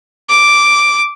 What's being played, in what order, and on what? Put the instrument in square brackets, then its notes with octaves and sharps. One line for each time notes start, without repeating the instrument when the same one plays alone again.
[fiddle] D6